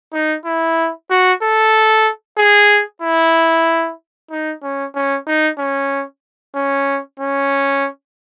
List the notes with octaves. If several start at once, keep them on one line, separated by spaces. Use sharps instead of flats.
D#4
E4
F#4
A4
G#4
E4
D#4
C#4
C#4
D#4
C#4
C#4
C#4